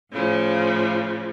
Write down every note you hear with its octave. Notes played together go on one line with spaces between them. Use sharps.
A2 C#3 F3